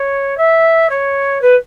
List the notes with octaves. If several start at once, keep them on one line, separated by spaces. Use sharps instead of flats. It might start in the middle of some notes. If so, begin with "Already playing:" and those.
Already playing: C#5
E5
C#5
B4